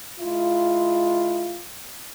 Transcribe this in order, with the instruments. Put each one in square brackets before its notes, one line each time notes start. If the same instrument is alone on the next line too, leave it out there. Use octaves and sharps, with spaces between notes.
[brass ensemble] G#3 E4 F4